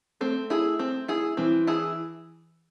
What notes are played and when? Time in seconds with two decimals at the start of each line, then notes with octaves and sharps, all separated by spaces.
0.21 A3 C4
0.50 E4 G#4
0.79 C4
1.08 E4 G#4
1.37 E3 C4
1.67 E4 G#4